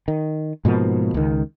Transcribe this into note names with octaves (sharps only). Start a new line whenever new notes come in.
D#3
G#2 B2 F3 A#3
C#2 D#3